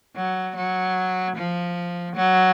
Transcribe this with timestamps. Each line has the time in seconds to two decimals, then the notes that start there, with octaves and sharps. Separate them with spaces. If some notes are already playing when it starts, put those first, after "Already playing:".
0.16 F#3
0.56 F#3
1.36 F3
2.16 F#3